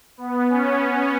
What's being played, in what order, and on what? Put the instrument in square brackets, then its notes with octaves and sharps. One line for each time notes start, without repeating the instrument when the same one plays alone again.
[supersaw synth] B3
C#4
C#4